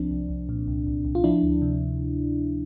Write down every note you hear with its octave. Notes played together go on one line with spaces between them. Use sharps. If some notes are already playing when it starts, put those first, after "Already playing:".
Already playing: C2 F3 C4 D4
C2
C2
A#2
C2
C2
C2
F4
F3 D4 E4
D2
C3